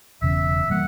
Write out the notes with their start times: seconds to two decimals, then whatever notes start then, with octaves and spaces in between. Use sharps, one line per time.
0.22 E1 E2 C#3 E5
0.70 E3 G3 A#3 F#5